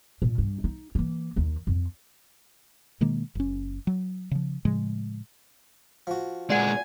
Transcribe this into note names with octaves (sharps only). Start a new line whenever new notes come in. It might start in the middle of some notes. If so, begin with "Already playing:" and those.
A#2
G2
D#4
E3 A#3
D#2 D#3
F2
B2 D#3 G#3 A#3
F#1 C#4
F#3
C#3 F3
A2 C#3 F3 G#3
F3 F#4
A#2 G#3 D5 F#5 G#5